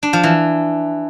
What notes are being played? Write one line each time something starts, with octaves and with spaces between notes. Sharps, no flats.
D4
F3
E3